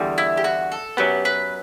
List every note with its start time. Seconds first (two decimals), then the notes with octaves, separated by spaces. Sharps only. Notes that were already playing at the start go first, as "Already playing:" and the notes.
Already playing: E2 D3 G3
0.18 E4
0.37 G4
0.44 F#4
0.72 A4
0.97 F#2 F#3 B3 G4
1.25 B4